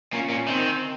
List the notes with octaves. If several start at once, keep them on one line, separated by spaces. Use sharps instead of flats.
A#2 C#4
A#2
D#3 C4